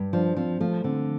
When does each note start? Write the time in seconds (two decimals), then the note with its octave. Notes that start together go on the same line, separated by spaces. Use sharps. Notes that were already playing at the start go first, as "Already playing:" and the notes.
Already playing: G2
0.13 F3 D4
0.36 F3 C4
0.60 F3 A3
0.84 D3 C4